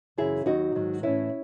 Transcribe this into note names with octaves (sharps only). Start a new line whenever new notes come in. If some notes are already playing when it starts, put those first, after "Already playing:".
F#2 C#3 E3 E4 G#4
D#2 D#3 F#3 D#4 F#4
G#2 D#3 F#3
A2 E3 C#4 E4